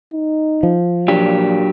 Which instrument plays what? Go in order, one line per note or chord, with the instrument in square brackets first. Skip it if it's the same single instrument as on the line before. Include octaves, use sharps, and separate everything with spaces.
[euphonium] D#4
[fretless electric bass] F3
[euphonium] A#2 [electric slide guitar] F#3 D4 G4